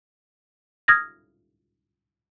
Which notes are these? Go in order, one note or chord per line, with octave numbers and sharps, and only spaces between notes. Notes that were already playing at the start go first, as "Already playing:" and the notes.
D#6 F6 G#6 A#6